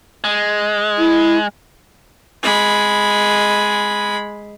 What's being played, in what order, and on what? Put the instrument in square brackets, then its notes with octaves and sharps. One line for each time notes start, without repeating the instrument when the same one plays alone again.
[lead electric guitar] G#3
[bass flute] E4
[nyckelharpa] G#3 B5